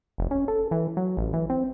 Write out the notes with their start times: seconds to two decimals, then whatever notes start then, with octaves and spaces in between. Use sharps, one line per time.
0.18 F1
0.31 C#4
0.48 A4
0.71 E3
0.97 F#3
1.17 A1
1.33 E3
1.50 C4